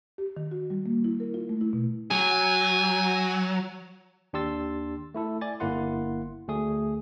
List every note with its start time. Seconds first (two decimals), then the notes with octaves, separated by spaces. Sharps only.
0.18 G4
0.37 D#3
0.51 F#4
0.70 G3
0.86 A#3
1.04 E4
1.20 A#4
1.34 F4
1.49 A3
1.61 E4
1.73 B2
2.11 F#3 G#5
4.33 D#2 D4 G4 C6 E6 A6
5.14 A3 E4 A4
5.41 D5 G#5 A6
5.60 G1 A#3 E4 F#5 C6
6.48 D2 A3 G#4 D#6